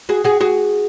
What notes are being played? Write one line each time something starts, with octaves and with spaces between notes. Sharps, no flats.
F#4 G#4
F#4 G#4
F#4 G#4